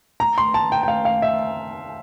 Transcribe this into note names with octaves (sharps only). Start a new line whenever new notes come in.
A#5
C6
A5
G5
G5
F5
F5
E5